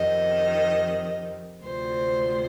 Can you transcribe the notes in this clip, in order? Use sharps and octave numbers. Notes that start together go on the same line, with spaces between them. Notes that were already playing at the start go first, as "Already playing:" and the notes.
Already playing: F2 C3 D#3 D#5
D2 C3 F3 C4 C5